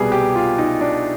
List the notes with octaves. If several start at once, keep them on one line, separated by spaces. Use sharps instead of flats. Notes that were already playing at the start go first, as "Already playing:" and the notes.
Already playing: C2 B2 G3 G#4 B4
G4
F4
D#4
D4